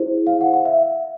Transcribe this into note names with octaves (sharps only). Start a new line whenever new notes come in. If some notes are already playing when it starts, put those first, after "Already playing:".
Already playing: E4 G#4 C5
F5
F#5
F5
E5